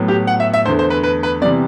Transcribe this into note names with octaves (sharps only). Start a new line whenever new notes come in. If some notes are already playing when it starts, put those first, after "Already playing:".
Already playing: A2 F#3 B3
G4
F#5
E5
E5
E2 D3 A3 C5
C5
B4
B4
B4
C3 E3 G3 B3 D5